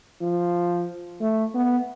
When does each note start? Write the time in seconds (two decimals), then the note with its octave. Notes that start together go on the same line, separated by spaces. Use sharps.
0.22 F3
1.21 A3
1.55 B3